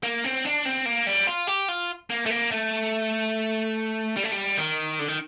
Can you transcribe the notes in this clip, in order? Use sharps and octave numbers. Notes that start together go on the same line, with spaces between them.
A#3
C4
D4
C4
A#3
G3
F4
G4
F4
A#3
A3
A#3
A3
G3
A3
G3
D#3
D3
D#3